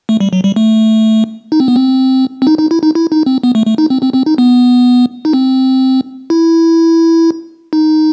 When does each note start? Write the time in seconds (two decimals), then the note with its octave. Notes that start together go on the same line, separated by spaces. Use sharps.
0.09 A3
0.20 G3
0.33 F#3
0.44 G3
0.56 A3
1.52 D#4
1.60 C4
1.68 B3
1.76 C4
2.42 C4
2.47 D#4
2.59 D#4
2.71 E4
2.83 D#4
2.95 E4
3.12 D#4
3.26 C4
3.43 B3
3.55 A3
3.66 A3
3.78 D#4
3.90 C4
4.03 C4
4.14 C4
4.26 D#4
4.38 B3
5.25 D#4
5.33 C4
6.30 E4
7.73 D#4